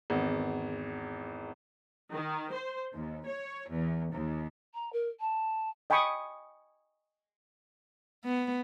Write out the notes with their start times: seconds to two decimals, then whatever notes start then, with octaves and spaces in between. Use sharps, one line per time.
0.10 G#1 E2
2.11 D#3
2.52 C5
2.92 D#2
3.28 C#5
3.68 E2
4.12 D#2
4.74 A#5
4.92 A#4
5.20 A5
5.90 D#5 G5 G#5 B5 C#6 D#6
8.25 B3